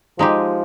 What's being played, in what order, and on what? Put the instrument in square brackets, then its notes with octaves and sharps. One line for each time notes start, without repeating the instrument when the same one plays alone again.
[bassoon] F3 [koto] G#3 D#4 G4